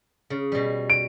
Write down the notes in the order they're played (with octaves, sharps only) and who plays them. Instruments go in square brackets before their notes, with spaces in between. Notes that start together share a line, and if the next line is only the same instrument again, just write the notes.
[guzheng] C#3
B2 G3
[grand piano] D7